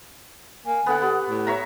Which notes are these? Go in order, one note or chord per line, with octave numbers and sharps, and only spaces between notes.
A#3 G#5
D3 B3 F#5
B3 G4
A2
C#5 E5 A#5